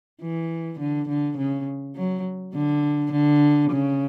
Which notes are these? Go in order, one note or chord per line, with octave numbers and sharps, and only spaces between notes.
E3
D3
D3
C#3
F#3
D3
D3
C#3